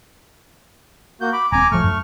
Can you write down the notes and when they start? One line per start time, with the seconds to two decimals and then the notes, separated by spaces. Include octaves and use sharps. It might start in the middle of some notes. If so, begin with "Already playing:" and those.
1.21 A#3 F#4 G6
1.33 B5 D6
1.52 D#1 C4 G#5 A#5 D6
1.72 D1 F3 A3 C#6 F6
1.84 F#2